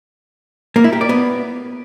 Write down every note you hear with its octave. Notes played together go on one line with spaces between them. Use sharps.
A#3
E4
G4
D5
B3